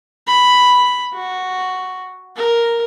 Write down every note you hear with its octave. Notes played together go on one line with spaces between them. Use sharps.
B5
F#4
A#4